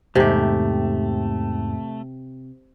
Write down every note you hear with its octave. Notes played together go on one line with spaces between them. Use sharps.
E2 G#2 C3 A3 G4